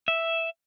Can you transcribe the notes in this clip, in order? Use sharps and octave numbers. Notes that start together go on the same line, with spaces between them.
E5